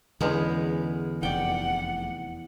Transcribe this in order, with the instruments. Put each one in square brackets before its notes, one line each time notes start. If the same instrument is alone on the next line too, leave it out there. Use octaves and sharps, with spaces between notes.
[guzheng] E2 G#3 B3 [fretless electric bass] D3 C#4
[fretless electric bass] F1 [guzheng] D5 G5 [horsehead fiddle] F#5